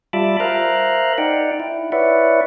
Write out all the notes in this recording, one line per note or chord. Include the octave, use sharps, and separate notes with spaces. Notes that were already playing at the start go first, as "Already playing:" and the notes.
G3 F4 E5 A5 B5 D6
A#4 C5 E5 F5 A#5 F#6
D#4 D5 F#5 G5
E4
E4 B4 C#5 D5 E5 F#5